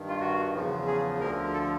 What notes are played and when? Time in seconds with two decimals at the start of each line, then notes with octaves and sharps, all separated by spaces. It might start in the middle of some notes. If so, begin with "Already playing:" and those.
Already playing: G2 D#3
0.08 F4
0.21 F#4
0.54 E2 C#3 F3
0.87 G#4
1.20 D2 D3 F3 A#4
1.54 A4